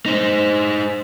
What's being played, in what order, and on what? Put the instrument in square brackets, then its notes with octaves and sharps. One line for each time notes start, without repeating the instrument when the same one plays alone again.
[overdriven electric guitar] D#4 C5